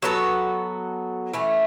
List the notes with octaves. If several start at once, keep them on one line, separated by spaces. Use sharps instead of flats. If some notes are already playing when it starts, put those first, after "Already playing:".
F#3 B3 F#4 A4
E3 A3 C#4